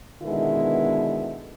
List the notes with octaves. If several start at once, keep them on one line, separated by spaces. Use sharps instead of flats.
B2 D3 D#3 G#3 B3 E4